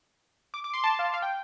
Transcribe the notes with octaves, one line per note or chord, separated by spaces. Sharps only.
D6
D6
C6
A5
F5
F5
G5